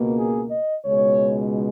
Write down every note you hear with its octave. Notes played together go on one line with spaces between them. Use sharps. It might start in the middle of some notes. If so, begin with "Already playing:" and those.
Already playing: C#2 B2 A#3
G#4
D#5
C#2 B2 G#3 C#5